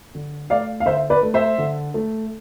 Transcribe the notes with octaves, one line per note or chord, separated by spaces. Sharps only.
D3
A3 D5 F5
F5
D3 C5 E5
B4 D5
A3
C5 E5
D3
A3